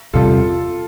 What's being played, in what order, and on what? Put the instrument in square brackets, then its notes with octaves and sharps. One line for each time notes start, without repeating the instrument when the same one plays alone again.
[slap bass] E2 C3 G3 [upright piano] F4 A4